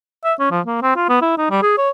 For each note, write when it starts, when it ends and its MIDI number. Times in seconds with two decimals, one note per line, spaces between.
0.24 0.34 76
0.40 0.50 61
0.51 0.61 53
0.66 0.80 58
0.82 0.96 60
0.96 1.08 65
1.09 1.20 59
1.22 1.33 64
1.38 1.50 63
1.51 1.59 55
1.63 1.76 68
1.78 1.90 73